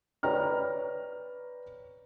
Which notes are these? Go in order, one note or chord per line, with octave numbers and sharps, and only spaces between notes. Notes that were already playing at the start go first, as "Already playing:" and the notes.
B4 C#5 D5 G5 A#5 F6